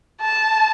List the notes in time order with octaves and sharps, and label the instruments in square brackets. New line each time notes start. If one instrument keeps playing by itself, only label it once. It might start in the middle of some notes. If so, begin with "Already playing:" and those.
[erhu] A5